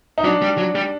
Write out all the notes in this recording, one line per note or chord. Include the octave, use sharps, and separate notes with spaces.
D#4
F#3 D4
G3
F#3
G3